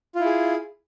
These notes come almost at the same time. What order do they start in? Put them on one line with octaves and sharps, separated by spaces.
F4 E4 G#4